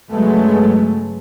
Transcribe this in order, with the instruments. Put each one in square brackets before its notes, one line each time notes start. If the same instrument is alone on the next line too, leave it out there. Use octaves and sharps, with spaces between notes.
[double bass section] G2 C#3 F#3 G#3 A3 B3